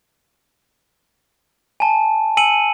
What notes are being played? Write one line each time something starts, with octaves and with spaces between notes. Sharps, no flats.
G#5 A5
G#5 E6 C#7 D#7 F#7